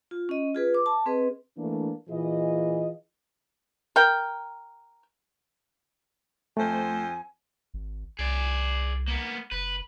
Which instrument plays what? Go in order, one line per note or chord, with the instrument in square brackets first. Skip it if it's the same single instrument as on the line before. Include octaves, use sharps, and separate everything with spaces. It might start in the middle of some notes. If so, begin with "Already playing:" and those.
[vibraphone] F4
C#4 D#5
F4 G#4 B4
D6
A5
C4 G#4 B4 D#5
[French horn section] E3 A3 A#3 D4
A#2 E3 F4 G#4 D#5
[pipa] A#4 G5
[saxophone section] F2 C5 [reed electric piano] A3 [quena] G#5
[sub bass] G#1
[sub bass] C2 [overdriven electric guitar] G#4 D5
[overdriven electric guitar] A#3 B3
[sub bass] F#1 [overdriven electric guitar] B4